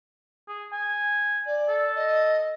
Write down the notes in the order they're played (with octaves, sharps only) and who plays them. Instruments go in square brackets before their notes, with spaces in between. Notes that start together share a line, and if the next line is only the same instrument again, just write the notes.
[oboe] G#4
G#5
[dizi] D5
[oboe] A4
[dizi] D#5